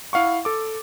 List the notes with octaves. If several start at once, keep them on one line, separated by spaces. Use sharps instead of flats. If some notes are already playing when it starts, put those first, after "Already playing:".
E4 F5 F#5 C#6
A4 D6